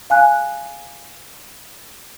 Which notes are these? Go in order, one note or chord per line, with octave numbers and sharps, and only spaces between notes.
F5 G#5 F#6